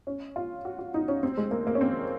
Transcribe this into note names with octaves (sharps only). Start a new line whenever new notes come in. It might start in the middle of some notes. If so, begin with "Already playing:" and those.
C#4
F4
F#4
F#4
D#4
C#4
C4
G#3
A#3
A#3
C#4
C4